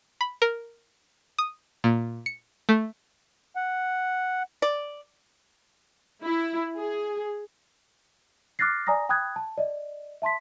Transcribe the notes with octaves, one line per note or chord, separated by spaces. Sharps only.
B5
A#4
D#6
A#2
C#7
A3
F#5
D5
E4
G#4
D6 F6 F#6 A6 A#6 C7
D5 G#5 A#5 D#6 A#6
G5 B5 D#6 F#6 G#6
A5
D5 D#5
E5 A5 C6 B6